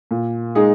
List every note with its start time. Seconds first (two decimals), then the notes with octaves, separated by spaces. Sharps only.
0.11 A#2
0.55 G#3 D#4 G#4